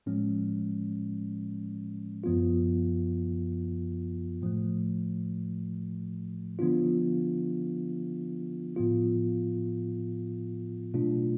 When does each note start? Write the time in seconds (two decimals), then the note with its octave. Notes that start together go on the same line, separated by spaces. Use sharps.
0.06 A2 F3 G#3 C#4
2.24 F#2 F3 B3 F4
4.42 A2 F3 A3
6.59 D3 F3 B3 D4 F4
8.76 A2 F3 B3 F4
10.94 B2 F#3 A3 D4 F4